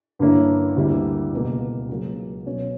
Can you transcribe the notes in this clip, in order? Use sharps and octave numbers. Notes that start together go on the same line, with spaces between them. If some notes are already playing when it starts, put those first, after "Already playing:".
G2 D3 A#3 C#4 E4
D2 D3 G3 A#3 E4
C#2 B2 A#3
C#2 C#3 F#3 A#3
B2 F#3 C#4